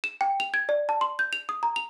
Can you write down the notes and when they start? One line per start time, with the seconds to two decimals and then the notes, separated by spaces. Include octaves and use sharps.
0.04 E7
0.21 G5
0.40 F7
0.54 G#6
0.69 D5
0.89 A5
1.01 C6
1.19 G6
1.33 F7
1.49 D#6
1.63 A#5
1.76 F7